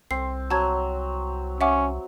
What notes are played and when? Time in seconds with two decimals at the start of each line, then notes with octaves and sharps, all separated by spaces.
0.11 C2 C4 C7
0.50 F#3 A5 G#6
1.61 C#4 E5 F#5 D6